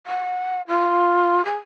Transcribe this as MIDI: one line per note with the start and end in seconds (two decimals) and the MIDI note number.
0.07 0.62 78
0.68 1.44 65
1.45 1.57 68